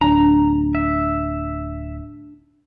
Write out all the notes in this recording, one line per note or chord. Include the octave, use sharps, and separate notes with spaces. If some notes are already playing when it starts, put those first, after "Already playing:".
D1 D4 A#5
E5